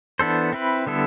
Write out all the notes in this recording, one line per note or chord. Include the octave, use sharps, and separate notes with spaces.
E3 B3 D4 A4 C5
C4 E4 B4
D3 G3 B3 E4 A4